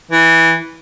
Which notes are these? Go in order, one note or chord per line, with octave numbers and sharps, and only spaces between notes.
E3